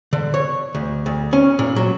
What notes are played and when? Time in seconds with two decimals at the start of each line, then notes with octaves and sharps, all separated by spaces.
0.13 D3
0.34 C#5
0.75 D2
1.06 D2
1.33 C#4
1.59 A#2
1.76 F#3